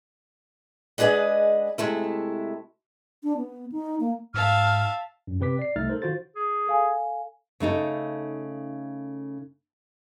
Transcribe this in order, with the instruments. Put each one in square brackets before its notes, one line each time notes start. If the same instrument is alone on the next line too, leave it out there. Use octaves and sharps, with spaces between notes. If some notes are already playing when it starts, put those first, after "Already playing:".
[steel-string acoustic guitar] G#3 D4 G#4 B4 D#5 F#5
C3 G#3 A3 E4
[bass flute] D4
B3
D#4
A#3
[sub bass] G#2 [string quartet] E5 F5 A5 [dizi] F6
[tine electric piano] F#2
C3 C4 B4 D6 B6
D5 C7
C2 A3 D#4 E5 F6 A6
A4 A#4 C5
D#3 F4 F#4 C5 A6
[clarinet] G#4
[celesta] A4 F5 G#5
[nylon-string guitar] C#3 A3 D#4 A4